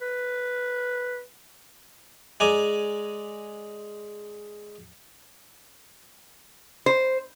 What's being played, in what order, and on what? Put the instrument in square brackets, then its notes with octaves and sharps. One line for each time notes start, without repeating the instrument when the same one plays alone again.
[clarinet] B4
[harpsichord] G#3 D5 G#5 A#5
[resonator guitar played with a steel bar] C5